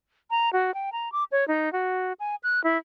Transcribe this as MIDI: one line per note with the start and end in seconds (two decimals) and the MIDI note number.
0.30 0.52 82
0.53 0.74 66
0.74 0.90 79
0.92 1.11 82
1.12 1.24 86
1.32 1.47 73
1.48 1.72 63
1.73 2.13 66
2.20 2.35 80
2.43 2.63 90
2.64 2.78 64